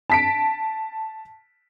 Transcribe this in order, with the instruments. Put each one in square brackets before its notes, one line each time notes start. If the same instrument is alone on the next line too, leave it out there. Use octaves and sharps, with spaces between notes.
[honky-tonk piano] A5 B6 D7